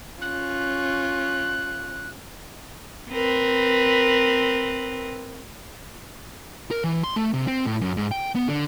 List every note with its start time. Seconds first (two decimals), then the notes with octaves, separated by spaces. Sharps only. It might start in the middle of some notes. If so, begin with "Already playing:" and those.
0.22 C#4 F4 F#6
3.11 C4 A#4 B4
6.71 A#4
6.84 E3
7.04 C6
7.16 A3
7.34 C3
7.47 C4
7.66 A2
7.81 F#2
7.97 G#2
8.11 G5
8.35 B3
8.48 D3